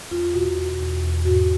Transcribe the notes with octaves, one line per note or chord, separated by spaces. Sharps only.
E2 F4
B2 F#4
E2
E2
E2
G#2 F#4